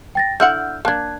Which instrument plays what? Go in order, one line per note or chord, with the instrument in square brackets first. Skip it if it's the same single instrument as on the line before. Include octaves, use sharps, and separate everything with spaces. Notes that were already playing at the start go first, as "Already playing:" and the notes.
[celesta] G5 A6 A#6
[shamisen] D3 E4 F#5 [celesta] E6 F6 G6
[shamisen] A#3 D4 [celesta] A5 F#6 G#6